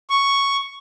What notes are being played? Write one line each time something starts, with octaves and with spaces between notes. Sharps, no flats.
C#6